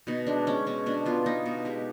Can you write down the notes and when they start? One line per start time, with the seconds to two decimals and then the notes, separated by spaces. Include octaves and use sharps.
0.07 B2 D#4
0.27 G#3 D4
0.47 G#3 C#4
0.67 B2 C#4
0.86 B2 D4
1.06 B3 F4
1.26 B3 D#4
1.46 B2
1.65 G#3 G4